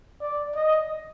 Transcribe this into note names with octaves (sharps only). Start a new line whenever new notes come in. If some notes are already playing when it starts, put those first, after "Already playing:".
D5
D#5